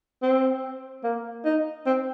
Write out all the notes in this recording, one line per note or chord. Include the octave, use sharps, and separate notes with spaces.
C4
A#3
D#4
C4